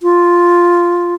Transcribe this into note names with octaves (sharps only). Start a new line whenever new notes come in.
F4